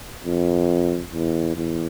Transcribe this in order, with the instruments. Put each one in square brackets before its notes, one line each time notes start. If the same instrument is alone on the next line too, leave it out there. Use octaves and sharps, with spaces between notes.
[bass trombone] F2
E2
E2